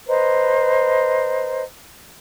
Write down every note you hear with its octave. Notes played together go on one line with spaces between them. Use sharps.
B4 C5 D#5 A#5